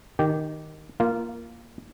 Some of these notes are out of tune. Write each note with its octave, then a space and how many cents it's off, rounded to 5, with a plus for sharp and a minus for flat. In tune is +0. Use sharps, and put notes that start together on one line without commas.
D#3 -5 G4 -10
A#3 +0 F4 -15